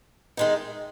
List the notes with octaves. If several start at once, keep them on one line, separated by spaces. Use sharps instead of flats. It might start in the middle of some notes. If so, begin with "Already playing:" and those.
D#3 G#3 D#4